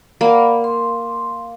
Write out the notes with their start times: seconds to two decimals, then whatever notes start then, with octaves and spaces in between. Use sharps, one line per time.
0.21 A#3 D5 F#5 B5
0.64 C6